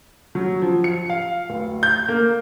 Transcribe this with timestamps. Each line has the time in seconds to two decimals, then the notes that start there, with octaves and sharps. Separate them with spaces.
0.35 F#3
0.62 F3
0.84 C#7
1.10 F5
1.50 D1
1.83 G6
2.09 A#3